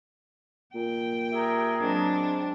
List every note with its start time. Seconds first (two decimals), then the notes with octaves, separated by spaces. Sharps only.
0.75 A#2 G5
1.32 G4 G#4 A#4 E5
1.81 F#3 G#3 C4 D4